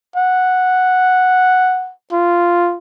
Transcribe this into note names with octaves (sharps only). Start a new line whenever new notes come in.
F#5
F4